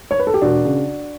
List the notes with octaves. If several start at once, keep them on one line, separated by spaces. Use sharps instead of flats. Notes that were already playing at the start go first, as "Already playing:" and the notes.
C#5
B4
A4
G4
E1 D4 F#4
C#3